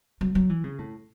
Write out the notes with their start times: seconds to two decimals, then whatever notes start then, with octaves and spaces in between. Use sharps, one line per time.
0.21 F#3
0.35 F#3
0.49 E3
0.64 C#3
0.78 A2